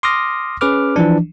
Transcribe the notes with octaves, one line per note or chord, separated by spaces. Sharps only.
C6 D6 D#6 F6 A#6
C#4 G#4 B4 D6 F6
E3 F3 D4